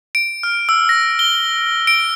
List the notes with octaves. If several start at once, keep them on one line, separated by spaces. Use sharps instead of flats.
D7
F6
E6
A#6
G7
D7